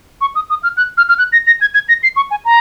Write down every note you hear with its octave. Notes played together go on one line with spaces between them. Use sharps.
C#6
D#6
D#6
F6
F#6
F6
F6
F#6
A#6
A#6
G#6
G#6
A#6
C7
C#6
G#5
A#5